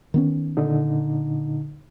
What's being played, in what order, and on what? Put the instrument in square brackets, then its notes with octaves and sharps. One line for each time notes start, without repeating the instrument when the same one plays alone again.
[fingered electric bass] D#3 B3 C#4
[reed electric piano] A#2 D3 D#4